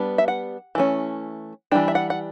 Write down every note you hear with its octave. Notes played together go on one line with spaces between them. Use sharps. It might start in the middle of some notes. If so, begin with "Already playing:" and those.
Already playing: G3 B3 D4
E5
F#5
E3 A3 C#4
E3 G3 D4 G5
E5
F#5
F#5